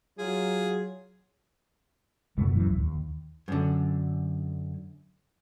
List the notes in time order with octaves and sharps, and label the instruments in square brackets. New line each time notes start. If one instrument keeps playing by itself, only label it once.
[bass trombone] F#3 [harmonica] F4 G#4
[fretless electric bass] F#1 D#2 B2 A3
F#2 E3
D1
D#2
[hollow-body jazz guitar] F#2 D3